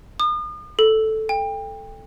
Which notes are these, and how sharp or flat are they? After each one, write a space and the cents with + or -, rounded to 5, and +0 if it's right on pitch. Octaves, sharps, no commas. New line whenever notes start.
D#6 -40
A4 -5
G5 +30